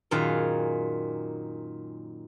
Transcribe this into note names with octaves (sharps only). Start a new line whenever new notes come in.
F#2 A#2 D#3 G#4 F5 F#5